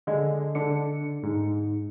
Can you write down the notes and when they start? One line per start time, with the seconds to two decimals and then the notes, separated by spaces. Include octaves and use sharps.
0.07 D3 G#3
0.55 D3 D4 C#7
1.23 G#2